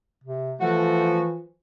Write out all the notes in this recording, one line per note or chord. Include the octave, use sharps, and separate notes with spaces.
C3
E3 F3 A3 F#4